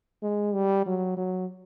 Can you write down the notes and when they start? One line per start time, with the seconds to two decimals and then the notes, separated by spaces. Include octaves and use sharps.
0.23 G#3
0.54 G3
0.86 F#3
1.17 F#3